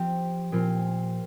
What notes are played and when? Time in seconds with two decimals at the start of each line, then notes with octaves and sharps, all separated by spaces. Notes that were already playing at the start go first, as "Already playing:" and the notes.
Already playing: F3 C4 G4
0.52 A#2 F3 C4 F4